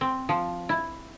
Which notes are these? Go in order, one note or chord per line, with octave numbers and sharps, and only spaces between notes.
C4
F3
E4